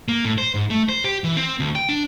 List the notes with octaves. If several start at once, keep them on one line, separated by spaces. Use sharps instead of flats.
A#3
A2
C5
G#2
A3
C5
G4
E3
C4
D2
G5
D4